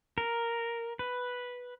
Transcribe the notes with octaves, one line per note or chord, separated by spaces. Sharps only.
A#4
B4